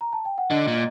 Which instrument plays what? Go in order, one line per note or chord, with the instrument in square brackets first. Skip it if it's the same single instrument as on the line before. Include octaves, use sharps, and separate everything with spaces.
[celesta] A#5
A5
G5
F#5
[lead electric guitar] D3 [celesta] D#5
[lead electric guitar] A#2